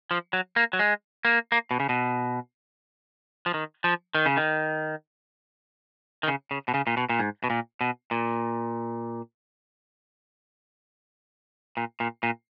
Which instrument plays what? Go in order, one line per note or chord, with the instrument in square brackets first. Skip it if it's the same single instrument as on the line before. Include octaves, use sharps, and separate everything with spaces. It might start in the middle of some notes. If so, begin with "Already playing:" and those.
[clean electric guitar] F3
F#3
A#3
F#3
G#3
A#3
A#3
B2
C#3
B2
F3
D#3
F3
D#3
C#3
D#3
D#3
C#3
C#3
B2
C#3
A#2
B2
A#2
G#2
B2
A#2
B2
A#2
A#2
A#2
A#2